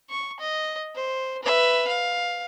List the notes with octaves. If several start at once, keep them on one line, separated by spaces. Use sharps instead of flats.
C#6
D#5
C5
B4 E5
F5